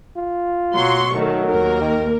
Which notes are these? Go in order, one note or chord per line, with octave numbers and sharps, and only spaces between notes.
F4
B2 F#3 C6 C#6
D#3 F#3 A3
D#2 A#3 A#4
D#3